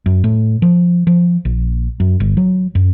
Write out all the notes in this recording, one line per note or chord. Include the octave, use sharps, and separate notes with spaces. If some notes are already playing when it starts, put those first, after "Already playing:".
F#2
A2
F3
F3
A#1
F#2
G1
F#3
F#2